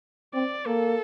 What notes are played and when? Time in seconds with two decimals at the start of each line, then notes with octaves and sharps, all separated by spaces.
0.34 C4 D5
0.66 A#3 A4